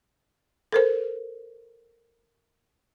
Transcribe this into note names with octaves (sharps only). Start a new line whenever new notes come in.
A4 A#4 C5